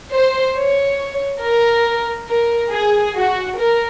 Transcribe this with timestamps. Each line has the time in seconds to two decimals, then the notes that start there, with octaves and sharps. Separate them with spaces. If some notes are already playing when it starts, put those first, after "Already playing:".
0.13 C5
0.56 C#5
1.42 A#4
2.29 A#4
2.72 G#4
3.16 F#4
3.58 A#4